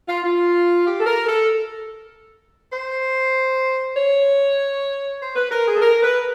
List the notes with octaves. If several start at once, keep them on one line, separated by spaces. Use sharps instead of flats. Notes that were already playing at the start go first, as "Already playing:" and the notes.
F4
F4
G4
A4
A#4
A4
C5
C#5
C5
B4
A#4
G#4
A4
A#4
B4